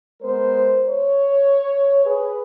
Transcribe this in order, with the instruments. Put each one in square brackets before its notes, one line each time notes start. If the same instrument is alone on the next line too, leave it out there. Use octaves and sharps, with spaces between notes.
[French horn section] G#3 B3 A#4 C5
C#5
G#4 B4